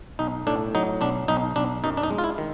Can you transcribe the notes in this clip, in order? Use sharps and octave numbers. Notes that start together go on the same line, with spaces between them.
B1 D#4
A2 D4
F#3 D#4
B1 D4
B1 D#4
B1 D4
F#2 D#4
D4
D#4
G#3
F4
E4
D#3